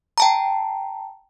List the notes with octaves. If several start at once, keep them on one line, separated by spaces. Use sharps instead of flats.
G5 A5 A#5